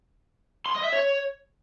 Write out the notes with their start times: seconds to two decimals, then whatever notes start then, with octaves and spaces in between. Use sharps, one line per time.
0.66 C6
0.75 D#5
0.84 E5
0.92 C#5